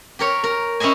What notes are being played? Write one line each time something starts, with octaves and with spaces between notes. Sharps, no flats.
G4 A#4 C#5
A#4
C#4 E4 C5 D#5 G#5